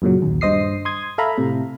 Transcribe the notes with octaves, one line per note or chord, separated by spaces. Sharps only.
F#2 A#2 C#3 F#3
A#1 D#2
G2 C5 D#5 D#6 C7
C6 D#6 G#6
A4 E5 F5 A#5 B5
A2 C3